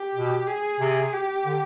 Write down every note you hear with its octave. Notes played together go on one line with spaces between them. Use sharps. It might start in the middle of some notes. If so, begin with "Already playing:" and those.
Already playing: G4
B2
G#4
C3
G4
D3